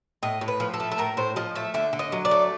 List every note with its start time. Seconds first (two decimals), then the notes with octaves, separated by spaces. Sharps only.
0.23 A2 D#5
0.41 A2
0.48 B4
0.60 F3
0.74 A4
0.80 A3
0.92 A4
0.98 A2 A#4
1.17 A2 C5
1.36 F3 D#5
1.55 A3 E5
1.74 D3 E5
1.93 D3
1.99 D#5
2.12 F#3
2.25 D5
2.31 A3